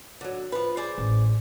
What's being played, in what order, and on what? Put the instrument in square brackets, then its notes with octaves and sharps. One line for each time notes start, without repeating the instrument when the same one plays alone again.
[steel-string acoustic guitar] D3 F#3
F3 B4
G#4 C5 D5
[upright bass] A1